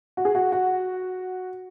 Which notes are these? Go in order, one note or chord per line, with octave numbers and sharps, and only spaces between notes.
F#4
G#4
F#4
F#4